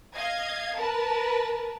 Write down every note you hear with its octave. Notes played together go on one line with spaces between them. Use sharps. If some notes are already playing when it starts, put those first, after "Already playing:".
D#5 F5 G#6
A#4 B4 A5